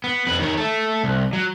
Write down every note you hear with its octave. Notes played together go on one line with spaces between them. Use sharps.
B3
F2 B4
D#3 C#5
A3 A4
C2
F#3